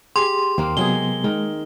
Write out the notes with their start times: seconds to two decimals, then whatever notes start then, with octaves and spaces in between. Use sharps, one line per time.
0.16 G4 G#4 C6
0.58 D#2 A#3 C4
0.77 C3 F#3 G#3 B3 G#4 G7
1.24 D#3 G#3